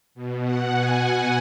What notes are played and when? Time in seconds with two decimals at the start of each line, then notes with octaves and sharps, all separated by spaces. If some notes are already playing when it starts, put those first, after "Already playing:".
0.15 B2
0.44 F#5
0.73 G#5
1.02 F#5